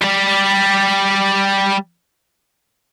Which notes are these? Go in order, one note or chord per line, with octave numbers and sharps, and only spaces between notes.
G3 D5